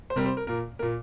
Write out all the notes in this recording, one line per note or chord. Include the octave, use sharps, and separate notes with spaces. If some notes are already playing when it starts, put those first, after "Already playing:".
C5
C3 G3 C4 A#4
C5
A#4
A#2 A#3 A#4
A#2 A#3 A#4